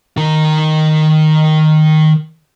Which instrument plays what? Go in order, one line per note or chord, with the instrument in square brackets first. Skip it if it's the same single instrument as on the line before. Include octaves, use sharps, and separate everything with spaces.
[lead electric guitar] D#3 A#4